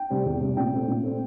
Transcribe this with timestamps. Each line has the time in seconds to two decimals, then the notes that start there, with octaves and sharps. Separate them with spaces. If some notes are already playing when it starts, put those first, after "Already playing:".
Already playing: G5
0.10 C3 G3 C4
0.25 E2
0.41 C3 G3 C4
0.57 A#2 G5
0.73 A3 C4
0.88 A#2
1.04 A3 C4